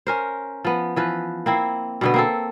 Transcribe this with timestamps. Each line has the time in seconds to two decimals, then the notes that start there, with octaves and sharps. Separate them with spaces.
0.07 C#4 A#4 C5
0.65 F3 B3
0.96 E3 F3 B4
1.46 A#3 C4 E4
2.01 B2 D3 B3
2.14 A#3 C4 A4